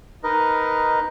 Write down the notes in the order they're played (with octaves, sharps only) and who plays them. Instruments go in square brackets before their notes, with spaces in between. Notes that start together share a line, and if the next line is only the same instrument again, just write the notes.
[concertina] D#4 A#4 B4 D#5